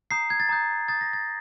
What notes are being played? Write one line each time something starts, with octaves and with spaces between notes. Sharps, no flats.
A#5 D#6 G6 C7
G#6
A6
A#5 D#6 G6
A#5 D#6 G6 A6
A#6
A6